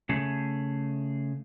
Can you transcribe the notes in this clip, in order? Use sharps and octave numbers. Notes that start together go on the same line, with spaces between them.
C#3 A3 G#4